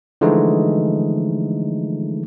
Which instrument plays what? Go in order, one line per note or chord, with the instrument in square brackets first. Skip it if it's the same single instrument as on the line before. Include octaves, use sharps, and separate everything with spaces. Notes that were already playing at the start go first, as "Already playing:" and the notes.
[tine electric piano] D3 E3 F3 G#3 A3 D#4